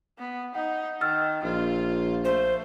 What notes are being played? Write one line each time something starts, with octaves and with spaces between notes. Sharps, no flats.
B3
D#4 F#5
D#3 E6 F6 A6
A#1 F4
A3 C5